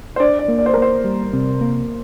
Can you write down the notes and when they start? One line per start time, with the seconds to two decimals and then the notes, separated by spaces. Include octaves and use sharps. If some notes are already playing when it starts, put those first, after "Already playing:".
0.16 C5
0.20 D4 D5
0.39 D5
0.48 A#3
0.58 D5
0.66 C5
0.74 A#4
0.77 A#3 C5
1.04 G3
1.33 C3
1.61 A#3